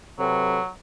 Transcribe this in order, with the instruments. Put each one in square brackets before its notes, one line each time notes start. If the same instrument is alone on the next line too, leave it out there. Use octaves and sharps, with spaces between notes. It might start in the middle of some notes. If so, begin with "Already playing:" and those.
[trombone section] C3 A4 B4 [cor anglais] F#3